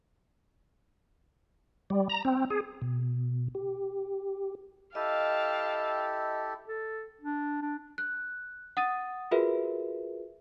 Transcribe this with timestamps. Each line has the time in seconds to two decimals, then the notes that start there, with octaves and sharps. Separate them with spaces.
1.90 G3
2.09 A#5
2.25 C4
2.50 G#4
2.82 B2
3.55 G4
4.95 E4 G4 A4 D#5 F5 G5 A5
6.67 A4
7.21 D4
7.62 D4
7.98 F#6
8.77 F#5 D#6 A6 D#7
9.31 F4 F#4 G#4 A#4 B4 E5